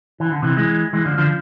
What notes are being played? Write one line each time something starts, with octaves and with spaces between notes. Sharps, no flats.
E3
D3
C3 E3
E3 G#3
E3 G#3
D3 F3
D3 F3